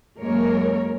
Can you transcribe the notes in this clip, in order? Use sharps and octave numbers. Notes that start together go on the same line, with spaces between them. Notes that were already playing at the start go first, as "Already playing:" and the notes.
F#2 G#3 A#3 A#4 C#5